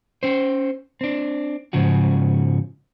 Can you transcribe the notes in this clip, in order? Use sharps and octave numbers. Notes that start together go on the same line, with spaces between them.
C#4 C5
C4 D4
G#2 C#3 F3 F#4